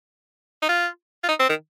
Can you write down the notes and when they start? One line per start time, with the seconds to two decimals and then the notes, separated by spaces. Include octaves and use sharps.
0.62 D#4
0.69 F4
1.24 F4
1.29 D#4
1.39 C4
1.49 D#3